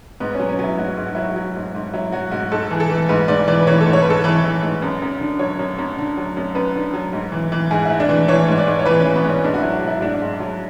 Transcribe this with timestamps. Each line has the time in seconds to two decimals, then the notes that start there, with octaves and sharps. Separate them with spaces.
0.20 G#2 B3
0.35 F#3 C#4
0.49 C#4
0.59 F#3 E4
0.78 G#2 F#4
0.97 G#2
1.07 F#4
1.15 F#3 E4
1.23 F#4
1.36 F#3
1.55 G#2
1.75 G#2
1.93 F#3 E4
2.12 F#3 F#4
2.31 G#2 F#4
2.52 G#2 A4
2.71 E3 G#4
2.80 A4
2.90 E3
3.09 G#2 B4
3.28 G#2 D5
3.48 E3 D5
3.61 B4
3.67 E3 C#5
3.80 A4
3.86 G#2
3.93 C#5
4.02 B4
4.06 G#2 A4
4.24 E3 B4
4.44 E3
4.63 G#2
4.82 F#2
5.02 F#2
5.20 D3
5.39 F#3 C#5
5.59 F#2
5.78 F#2
5.98 D3
6.17 F#3
6.37 F#2
6.55 F#2 B4
6.75 D3
6.93 F#3
7.13 G#2
7.32 E3
7.52 E3
7.71 G#2 G#4
7.85 G#2 E4
8.00 D4
8.09 E3
8.28 E3 C#5
8.48 G#2
8.58 D5
8.67 G#2
8.79 C#5
8.86 E3 B4
9.00 C#4
9.05 E3
9.16 B3
9.25 G#2 C#4
9.44 G#2 D4
9.54 F#4
9.58 F#3 E4
9.72 F#4
9.82 F#3
9.87 E4
10.01 G#2 D4
10.21 G#2
10.40 F#3